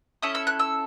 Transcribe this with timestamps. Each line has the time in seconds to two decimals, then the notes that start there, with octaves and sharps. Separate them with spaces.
0.23 C#4 E4 A4 D#6
0.35 E6
0.47 F#6
0.59 E6